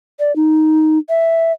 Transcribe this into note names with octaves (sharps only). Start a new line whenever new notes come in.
D5
D#4
E5